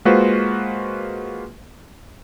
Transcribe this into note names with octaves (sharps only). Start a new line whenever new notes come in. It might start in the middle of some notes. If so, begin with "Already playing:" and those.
G#3 A#3 F4 F#4 B4 C5